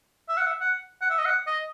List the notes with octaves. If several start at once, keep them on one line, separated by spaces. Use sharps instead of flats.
E5
F#5
E5
F#5
F#5
E5
D#5
F#5
D#5